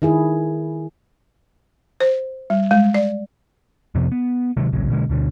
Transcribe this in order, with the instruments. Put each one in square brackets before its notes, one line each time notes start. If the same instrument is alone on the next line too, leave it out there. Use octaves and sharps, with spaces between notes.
[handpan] D#3 E4 G#4
[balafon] C5
G3
G#3
D5
[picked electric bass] F2 C3 F3 B3
B3
C3 D#3 F#3 G#3
D1 A#1 C#3 F#3
B2 D3 G#3
D2 B2 D3